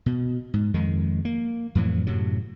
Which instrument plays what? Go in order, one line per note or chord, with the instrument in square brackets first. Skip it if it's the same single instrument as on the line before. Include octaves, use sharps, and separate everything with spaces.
[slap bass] B2
G#2
F2 D#3 G#3
A#3
F2 A2 E3 F#3
F#2 A2 C3 F#3